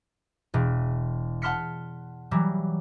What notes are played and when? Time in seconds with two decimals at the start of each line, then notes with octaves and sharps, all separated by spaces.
0.54 E1
1.42 F#5 A5 C6 F6 B6 C#7
2.31 E3 F#3 G3